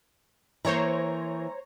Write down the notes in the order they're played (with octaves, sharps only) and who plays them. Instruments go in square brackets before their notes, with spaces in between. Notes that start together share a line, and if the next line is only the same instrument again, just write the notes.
[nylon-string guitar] E3 A#3 [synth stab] C5 C#5 A#5